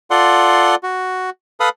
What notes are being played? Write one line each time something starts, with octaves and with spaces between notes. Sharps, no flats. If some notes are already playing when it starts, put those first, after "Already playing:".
F4 A4 D5 F#5 C6
F#4
A4 B4 F5 B5 D#6